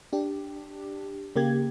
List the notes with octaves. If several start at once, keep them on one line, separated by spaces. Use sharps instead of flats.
D4 G4
C#3 A#3 G4 G#6